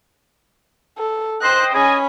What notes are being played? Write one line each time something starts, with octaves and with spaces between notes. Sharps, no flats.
A4
C5 D#5 G5 C6 F#6
C#4 G#4 D#5 G#5 B5